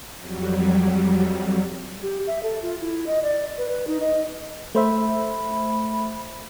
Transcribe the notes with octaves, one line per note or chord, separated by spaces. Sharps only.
F2 F#3 G3
G4
E5
A4
F4
E4
D#5
D5
B4
B4
D#4
D#5
A3 C5 E5 B5